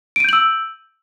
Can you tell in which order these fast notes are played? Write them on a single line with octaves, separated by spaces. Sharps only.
D7 D#7 G6 F#7 E6